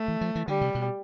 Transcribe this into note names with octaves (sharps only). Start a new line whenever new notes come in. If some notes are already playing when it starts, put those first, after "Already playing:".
Already playing: A3
E3
F3
E3
D3 G3
C3
B2